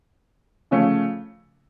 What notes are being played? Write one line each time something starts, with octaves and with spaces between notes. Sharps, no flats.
C#3 F3 A3 C#4